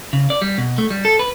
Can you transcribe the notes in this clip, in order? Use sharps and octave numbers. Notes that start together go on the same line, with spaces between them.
C#3
D5
G3
B2
A3
G3
A4
B4